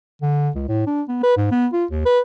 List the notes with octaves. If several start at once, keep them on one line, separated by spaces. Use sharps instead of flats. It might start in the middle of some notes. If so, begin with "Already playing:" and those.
D3
C#2
A2
D4
B3
B4
G#2
B3
F4
D#2
B4